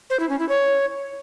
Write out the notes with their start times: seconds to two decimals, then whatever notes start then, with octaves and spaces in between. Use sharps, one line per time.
0.10 C5
0.20 E4
0.29 C#4
0.39 E4
0.49 C#5